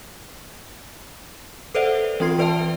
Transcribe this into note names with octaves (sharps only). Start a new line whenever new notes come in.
A4 B4 C5 D5 E5 F#5
E3 C4 F4 C6 C7
E3 B4 D5 E5 G5 A5